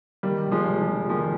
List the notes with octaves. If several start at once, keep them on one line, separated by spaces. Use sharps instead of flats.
D#3 G3
F1
F3 G#3
F1
F3
F2
D#3 F3 G#3